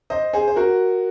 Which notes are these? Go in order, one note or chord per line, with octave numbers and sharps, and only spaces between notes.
C5 D#5
G#4 C5
C5
F#4 A#4